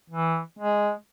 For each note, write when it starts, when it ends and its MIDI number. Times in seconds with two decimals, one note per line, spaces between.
0.10 0.40 52
0.59 0.91 56